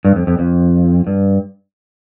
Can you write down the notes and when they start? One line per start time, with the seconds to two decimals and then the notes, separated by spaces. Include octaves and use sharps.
0.05 G2
0.16 F2
0.27 F2
0.39 F2
1.07 G2